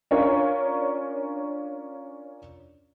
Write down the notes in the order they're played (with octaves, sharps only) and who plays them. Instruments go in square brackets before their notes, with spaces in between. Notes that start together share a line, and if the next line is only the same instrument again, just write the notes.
[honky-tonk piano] C#4 D4 F4 A#4 C#5